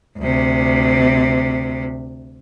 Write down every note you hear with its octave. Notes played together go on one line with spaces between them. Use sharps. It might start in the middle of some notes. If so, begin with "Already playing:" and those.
D2 C3